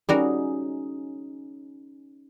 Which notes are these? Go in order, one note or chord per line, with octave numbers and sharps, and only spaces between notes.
G3 C#4 D#4 F#4 G#4 A#4